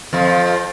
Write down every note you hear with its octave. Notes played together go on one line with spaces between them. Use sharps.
F2 F3